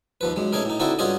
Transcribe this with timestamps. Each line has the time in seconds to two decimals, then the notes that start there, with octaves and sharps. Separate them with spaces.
0.21 D#2 F3 B4
0.36 F#2 G#3
0.53 A3 C#4 D#4 G#4 A#4
0.65 A2 D#4
0.80 D3 C4 D#4 E4 F#4 A4
0.99 G2 C#4 F4 F#4 G#4 D#5